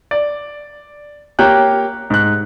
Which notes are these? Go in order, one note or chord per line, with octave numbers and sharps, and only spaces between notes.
D5
A#3 G4 C#5 G5 F#6
G#2 F#6